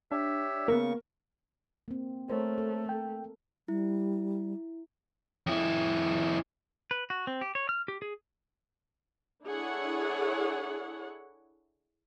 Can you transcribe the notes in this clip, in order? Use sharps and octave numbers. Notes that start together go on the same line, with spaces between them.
D4 G4 C#5 E5
C#3 A#3 B3 A#4 C#6
A#3 C4
A3 A#4 C5 C#5
A4
G5
G3 E4
F2 E4
B4
F#4
C4
G4
C#5
F6
G4
G#4
D4 E4 G#4 A4 C#5 F#5